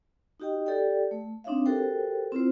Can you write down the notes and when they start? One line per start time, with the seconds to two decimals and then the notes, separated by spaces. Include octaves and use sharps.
0.40 D#4 F#4 G4 D#5 G5
0.66 G4 A4 D5 G5
1.11 A3
1.44 C4 D4 D#4 C#5 E5 F5
1.66 F#4 G4 A4 A#4 C5 G5
2.32 C4 E4 F4 C5